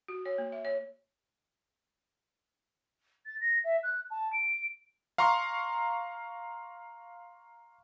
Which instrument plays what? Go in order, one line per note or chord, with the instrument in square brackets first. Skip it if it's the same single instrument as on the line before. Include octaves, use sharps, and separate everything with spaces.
[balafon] F#4
C#5
A#3
E5
C#5
[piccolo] A6
A#6
E5
F#6
A5
D7
[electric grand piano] F5 A#5 C6 C#6